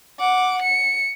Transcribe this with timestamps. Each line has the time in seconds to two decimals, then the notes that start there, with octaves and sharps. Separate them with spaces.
0.20 F#5 D6
0.62 C#7